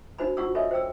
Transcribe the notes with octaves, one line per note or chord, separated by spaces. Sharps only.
D4 D#4 F#4 C5 G#5 B5
F4 F#4 F#5 C#6 E6
A4 C#5 D#5 E5 G#5 B5
C5 G5 E6